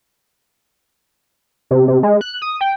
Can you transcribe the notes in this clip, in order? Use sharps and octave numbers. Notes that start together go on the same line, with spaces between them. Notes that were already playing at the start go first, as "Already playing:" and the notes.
C3
C3
G#3
F#6
D#6
G5